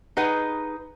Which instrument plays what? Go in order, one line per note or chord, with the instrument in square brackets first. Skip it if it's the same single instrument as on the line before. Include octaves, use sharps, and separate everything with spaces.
[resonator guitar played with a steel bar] D#4 G#4 B4 F#5